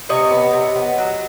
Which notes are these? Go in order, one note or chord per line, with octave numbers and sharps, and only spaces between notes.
C3 C#5 D#5
B3
C3
B3
F#3